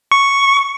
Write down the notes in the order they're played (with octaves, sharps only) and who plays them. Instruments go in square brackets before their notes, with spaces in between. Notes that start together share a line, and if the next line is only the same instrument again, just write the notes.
[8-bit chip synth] C#6